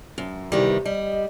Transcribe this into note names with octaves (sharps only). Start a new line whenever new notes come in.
F#2
E2 C3 D#3 E3 G3 G4
G3 D#5